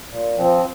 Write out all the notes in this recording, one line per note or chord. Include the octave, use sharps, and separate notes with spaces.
A#2
F3 C4